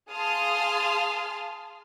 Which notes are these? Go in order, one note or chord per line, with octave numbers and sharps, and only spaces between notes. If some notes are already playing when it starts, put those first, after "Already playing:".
G#4 F5 A5 C6 D#6 F6